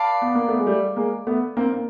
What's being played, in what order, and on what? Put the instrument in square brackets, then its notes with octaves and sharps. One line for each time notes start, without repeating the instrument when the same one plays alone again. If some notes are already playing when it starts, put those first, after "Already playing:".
Already playing: [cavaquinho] B4 D5 F5 A5
[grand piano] B3
A#3
A3 B3
G#3
G3 A3
G#3 A#3
A3 B3
A#3 C4
A#3